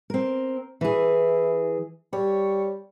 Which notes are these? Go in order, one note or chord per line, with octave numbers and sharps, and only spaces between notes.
C4 A#4
E3 E4 G#4
G3 C#5